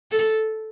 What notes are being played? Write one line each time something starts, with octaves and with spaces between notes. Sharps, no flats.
A4